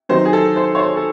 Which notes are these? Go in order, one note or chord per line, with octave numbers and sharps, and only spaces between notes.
D#3 F#3 C4 D#4 C5
G#4
A4
C5
C#5
C5
A4